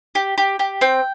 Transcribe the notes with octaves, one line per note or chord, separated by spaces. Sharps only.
G4
G4
G4
C4 G5